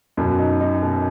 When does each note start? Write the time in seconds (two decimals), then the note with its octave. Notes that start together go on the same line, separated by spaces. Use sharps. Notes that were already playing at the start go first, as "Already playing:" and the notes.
0.17 F#2 B2
0.39 D#4
0.61 D#4
0.82 B2